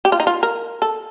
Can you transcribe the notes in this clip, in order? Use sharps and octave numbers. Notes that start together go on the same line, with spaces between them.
G4
F4
D#4
F4
A#4
A4